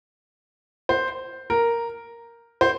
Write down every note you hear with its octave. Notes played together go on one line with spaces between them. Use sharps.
C5
A#4
C5